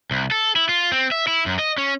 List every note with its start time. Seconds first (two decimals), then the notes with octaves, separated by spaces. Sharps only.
0.11 C2
0.31 A4
0.56 E4
0.69 F4
0.92 C4
1.11 E5
1.27 E4
1.46 F#2
1.59 D#5
1.78 C#4